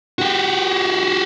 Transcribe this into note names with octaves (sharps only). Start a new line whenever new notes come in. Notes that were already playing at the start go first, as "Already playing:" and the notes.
F#4 G4